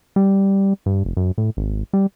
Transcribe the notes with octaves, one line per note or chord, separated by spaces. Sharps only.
G3
G2
F1
F#2
A2
G#1
G3